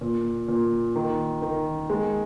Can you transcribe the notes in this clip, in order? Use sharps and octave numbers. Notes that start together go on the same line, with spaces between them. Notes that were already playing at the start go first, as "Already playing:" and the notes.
A#2
A#2
D#3
D#3
G#3